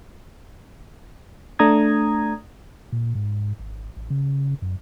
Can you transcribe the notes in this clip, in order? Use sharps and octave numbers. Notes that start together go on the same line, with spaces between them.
A3 D4 A#5 D#6 G#6
A#2
G#2
G#1
A1
C#3
F#2